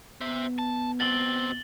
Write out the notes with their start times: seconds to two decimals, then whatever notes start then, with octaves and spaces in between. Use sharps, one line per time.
0.21 B3 C5 E5
0.59 A5
1.00 B2 C4 A6 F#7 G7